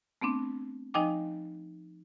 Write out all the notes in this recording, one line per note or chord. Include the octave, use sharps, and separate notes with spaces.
A3 B3 C4 D4
F3 D#4 D#5 G5 G#5 D6